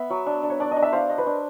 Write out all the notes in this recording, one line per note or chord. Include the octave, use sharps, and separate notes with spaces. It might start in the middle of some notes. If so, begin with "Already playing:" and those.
Already playing: B3 E5
F#3
D4
D4
C#5
D4 D5
D#5
D4
E5
C5 F5
D#5
B4
D4